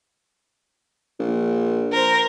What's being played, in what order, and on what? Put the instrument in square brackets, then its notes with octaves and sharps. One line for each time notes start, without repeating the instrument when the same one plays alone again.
[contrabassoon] A#1
[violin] A#4 C5